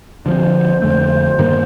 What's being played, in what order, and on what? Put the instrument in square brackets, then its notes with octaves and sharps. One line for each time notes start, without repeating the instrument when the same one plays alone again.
[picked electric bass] D3 F3 C4 [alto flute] C5
[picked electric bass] F2 D3 A3
G2 D#3 G3 A#3